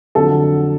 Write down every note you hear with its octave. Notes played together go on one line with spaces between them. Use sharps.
F2 D3 F#3 A4